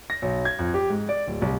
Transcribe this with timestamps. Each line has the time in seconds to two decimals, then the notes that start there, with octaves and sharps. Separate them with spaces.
0.10 A#6
0.22 B1
0.45 G#6
0.59 F2
0.74 G4
0.90 G#2
1.09 D5
1.27 D1
1.42 C2